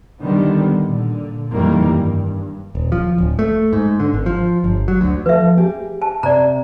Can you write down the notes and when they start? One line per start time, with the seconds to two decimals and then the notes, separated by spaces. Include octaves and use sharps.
0.23 D3 D#3 G3 B3
0.82 A#2 D3
1.52 F2 D#3 E3 G3 A#3
1.95 G2
2.75 D#1
2.92 F3
3.18 D1
3.39 A3
3.73 G#2
4.00 D3
4.14 G#1
4.26 F3
4.64 G1
4.88 F#3
5.01 D2
5.26 F3 A4 B4 E5
5.57 G4 G#4
6.02 A5
6.23 C3 D5 A#5